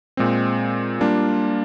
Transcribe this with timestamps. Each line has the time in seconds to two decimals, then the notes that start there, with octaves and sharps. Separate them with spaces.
0.17 A#2 G#3 C4
1.00 G3 A#3 D4 F4